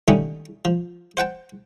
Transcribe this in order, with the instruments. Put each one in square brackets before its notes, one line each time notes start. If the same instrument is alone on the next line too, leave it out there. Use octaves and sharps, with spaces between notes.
[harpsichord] D3 D#3 G3 A3 C#4 D#4
F3
C5 F#5 G5 A5